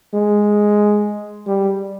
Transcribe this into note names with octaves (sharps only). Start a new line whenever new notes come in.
G#3
G3